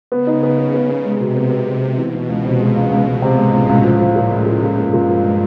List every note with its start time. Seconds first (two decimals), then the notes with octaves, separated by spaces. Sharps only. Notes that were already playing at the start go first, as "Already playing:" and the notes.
0.12 C#3 B3
0.27 D#4
0.43 B3
0.58 B3
0.74 B3
0.89 B3
1.05 C3 G#3
1.21 B2
1.36 B3
1.51 C3 B3
1.67 B2
1.82 B3
1.98 B2 E3
2.14 E3
2.29 C#2
2.44 C3
2.60 G#3
2.76 C#2
2.91 C#2
3.07 C#2
3.22 C3
3.38 A2 G#3
3.53 C#2
3.69 C#2
3.84 A2 F3
4.00 F3
4.16 A#2
4.31 G#3
4.46 A#2
4.62 A#2
4.78 G2 A#2
4.93 A#2
5.09 F3
5.24 G#3